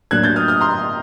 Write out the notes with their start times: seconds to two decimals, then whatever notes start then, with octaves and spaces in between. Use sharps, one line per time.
0.11 A2 F#3 A#3 D4 F#6 G#6
0.24 G6 A6
0.36 D#6 F6
0.48 D#6 F6
0.61 A#5 C6